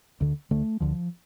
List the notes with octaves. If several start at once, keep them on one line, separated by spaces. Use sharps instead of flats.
D2 D3
D2 D3 A3
D2 D3 F3